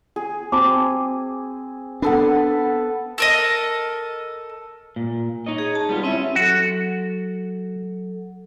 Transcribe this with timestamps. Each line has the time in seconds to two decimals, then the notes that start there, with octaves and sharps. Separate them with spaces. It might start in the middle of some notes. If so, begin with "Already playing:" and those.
0.16 G#4
0.52 C4 F#4 A5 D6
2.02 B3 D4 A4 B4
3.18 A4 A#4 D#5
4.96 A#2
5.46 D#4 C#5 D#5
5.58 G#4
5.75 A5
5.89 G3 B3 F4
6.04 G3 C4 C#4 E4 E5
6.35 F#3 F#4 A4